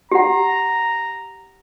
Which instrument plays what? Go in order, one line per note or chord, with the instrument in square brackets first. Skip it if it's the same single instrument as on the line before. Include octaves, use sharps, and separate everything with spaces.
[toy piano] G4 F#5 [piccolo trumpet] A#5